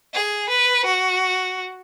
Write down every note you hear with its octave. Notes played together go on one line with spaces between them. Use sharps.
G#4
B4
F#4